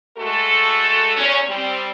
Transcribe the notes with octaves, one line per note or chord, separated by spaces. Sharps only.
G#3 A3 F#4 A4
E2 C#4
G3 C4